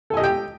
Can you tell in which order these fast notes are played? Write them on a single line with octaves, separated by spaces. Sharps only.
A4 G#5 D#5 G4 G5